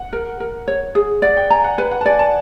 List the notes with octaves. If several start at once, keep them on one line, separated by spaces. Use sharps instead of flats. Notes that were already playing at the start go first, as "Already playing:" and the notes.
Already playing: F#5
A#4
A#4
C#5
G#4
D5 F#5
G5
G#5 A#5
F#5
B4
F#5
A5
D5 G#5
A5